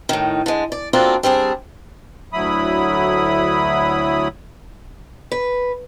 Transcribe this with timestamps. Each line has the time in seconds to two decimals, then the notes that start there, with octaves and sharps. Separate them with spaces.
0.09 A2 D#3
0.46 D3 G#3
0.72 D5
0.93 A#3 C4 D4 F4 F#4 A4
1.23 G3 C4 D4 G#4
2.33 D2 F#3 E4 B5 D#6
5.31 B4